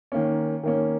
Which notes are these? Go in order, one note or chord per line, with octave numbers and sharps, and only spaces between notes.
D#3 A#3 C#4
D#3 A#3 C#4